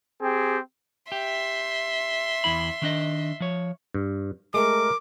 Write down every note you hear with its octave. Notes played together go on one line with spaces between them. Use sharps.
C4 G4 G#4
G4 E5 C6
E2 E4 B5
D#3 D4 D#5
F3 C#5
G2
G#3 A3 A#4 D6